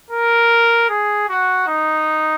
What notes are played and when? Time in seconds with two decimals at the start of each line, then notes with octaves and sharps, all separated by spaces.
0.11 A#4
0.89 G#4
1.29 F#4
1.67 D#4